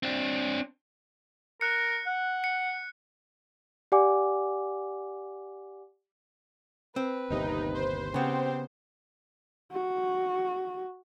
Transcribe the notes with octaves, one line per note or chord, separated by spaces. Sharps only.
C4 D4
A#4 F#6 C#7
F#5
C#7
G4 D5 F#5 G#5 D6
C4 B4
G1 D#2 C3 D#4
C5
C#3 B3 C4 G4
F#4